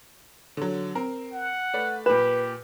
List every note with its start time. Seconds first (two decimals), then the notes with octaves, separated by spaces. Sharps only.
0.57 D3 F#3
0.95 C4 A#4
1.33 F#5
1.74 A3 B4 D5
2.06 A#2 G4 B4 E7